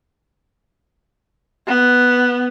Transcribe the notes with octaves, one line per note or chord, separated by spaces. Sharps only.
B3